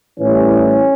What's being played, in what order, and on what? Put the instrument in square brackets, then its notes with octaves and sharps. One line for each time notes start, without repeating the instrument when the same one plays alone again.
[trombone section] A2 E3 G3 C#4